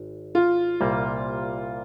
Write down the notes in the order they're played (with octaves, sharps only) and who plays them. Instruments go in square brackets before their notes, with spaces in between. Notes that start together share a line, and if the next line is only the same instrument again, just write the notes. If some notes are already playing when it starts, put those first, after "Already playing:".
Already playing: [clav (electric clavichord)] G#1
[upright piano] F4
[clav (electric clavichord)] C2 A#2 G3 A#3